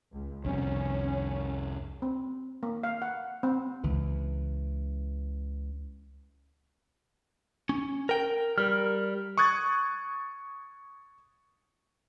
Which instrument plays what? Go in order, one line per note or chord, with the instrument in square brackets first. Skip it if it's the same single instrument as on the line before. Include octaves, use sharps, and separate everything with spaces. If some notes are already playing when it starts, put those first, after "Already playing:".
[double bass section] C#2
[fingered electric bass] C2 F2 [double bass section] C#4
[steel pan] C4
A#3
F5
F#5
C4
[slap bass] C#2 E3
[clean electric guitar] C#4
A#4 G5
[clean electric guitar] G3 [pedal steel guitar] A#4 F6
[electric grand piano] C#6 D#6 F#6 G#6 A6